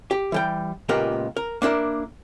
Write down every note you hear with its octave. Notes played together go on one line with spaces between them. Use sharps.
G4
E3 G3 G5
C#2 A#2 B3 G4 A#4
A#4
A#3 D4 E4 A#4